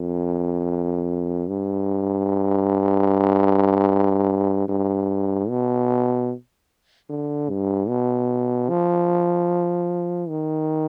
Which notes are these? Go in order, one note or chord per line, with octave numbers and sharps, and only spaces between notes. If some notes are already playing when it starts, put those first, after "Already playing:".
Already playing: F2
G2
G2
B2
D3
G2
B2
F3
D#3